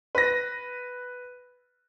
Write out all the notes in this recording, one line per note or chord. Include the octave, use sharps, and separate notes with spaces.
B4 A#6